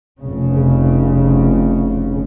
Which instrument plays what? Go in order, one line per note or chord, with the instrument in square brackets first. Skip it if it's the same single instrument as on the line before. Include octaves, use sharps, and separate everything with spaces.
[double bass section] F1 C#3